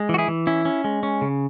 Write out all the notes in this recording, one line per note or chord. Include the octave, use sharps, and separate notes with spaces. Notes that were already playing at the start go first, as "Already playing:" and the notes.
Already playing: G#3
E3
F#4
E4 G#4
E3
C#4 E4
C#4
G#3
C#4
C#3